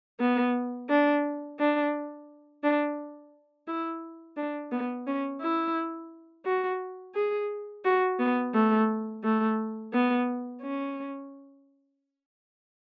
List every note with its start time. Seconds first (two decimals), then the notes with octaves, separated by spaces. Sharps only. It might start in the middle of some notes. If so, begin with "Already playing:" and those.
0.20 B3
0.89 D4
1.59 D4
2.63 D4
3.68 E4
4.37 D4
4.72 B3
5.07 C#4
5.41 E4
6.46 F#4
7.15 G#4
7.85 F#4
8.19 B3
8.54 A3
9.24 A3
9.93 B3
10.62 C#4